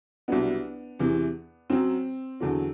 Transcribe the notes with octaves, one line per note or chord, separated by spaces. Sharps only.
C2 B2 F#3 B3 D4
E2 C3 E3
F#2 F#3 C4
E2 D3 F#3